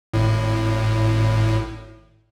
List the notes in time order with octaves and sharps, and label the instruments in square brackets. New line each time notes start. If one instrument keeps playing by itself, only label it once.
[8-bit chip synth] G#1 A2